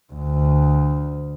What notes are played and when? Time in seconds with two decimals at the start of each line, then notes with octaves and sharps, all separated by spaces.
0.13 D2